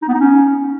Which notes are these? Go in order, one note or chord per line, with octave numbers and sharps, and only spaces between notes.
D#4
B3
D#4
C#4